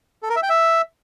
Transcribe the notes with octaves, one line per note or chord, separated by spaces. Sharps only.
A4
A#4
E5
G5
E5